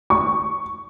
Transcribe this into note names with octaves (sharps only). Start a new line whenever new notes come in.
C#6